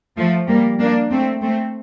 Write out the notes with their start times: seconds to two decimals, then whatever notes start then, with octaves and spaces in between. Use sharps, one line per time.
0.17 F3 A3
0.48 G3 A#3
0.80 A#3 D4
1.11 A3 C4
1.42 A3 C4